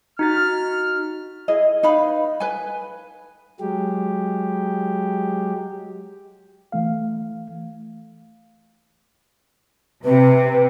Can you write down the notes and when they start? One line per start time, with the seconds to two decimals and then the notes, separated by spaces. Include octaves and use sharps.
0.19 D#4 F#4 F6 A6
1.48 E4 G#4 D#5
1.83 D#4 B4 F5 B5
2.40 B4 G#5
3.60 F#3 G#3 G4
6.72 E3 A3 F5
10.05 C3 B4